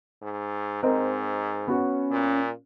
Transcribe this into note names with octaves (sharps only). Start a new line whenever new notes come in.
G#2
G#2 C4 A#4 D#5
B3 C#4 F#4
A#2